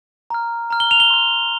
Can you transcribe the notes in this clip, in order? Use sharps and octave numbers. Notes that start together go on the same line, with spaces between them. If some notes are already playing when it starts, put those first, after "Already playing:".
A#5 F6
A#5 F6
G7
F7
G7
C6 F6